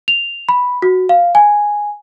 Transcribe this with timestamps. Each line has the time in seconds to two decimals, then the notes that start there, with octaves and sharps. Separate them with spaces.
0.08 F7
0.49 B5
0.82 F#4
1.09 F5
1.35 G#5